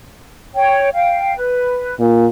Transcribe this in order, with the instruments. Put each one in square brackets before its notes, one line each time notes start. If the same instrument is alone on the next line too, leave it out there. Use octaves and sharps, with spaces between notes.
[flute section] C#5 G5
F5 G5
B4
[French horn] A#2